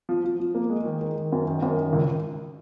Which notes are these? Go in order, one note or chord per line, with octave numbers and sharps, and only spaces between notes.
F3
F3
F3
A#3
G#3
D#3
D#3
D#3
F#2
D#3
F#2
D#3
C#2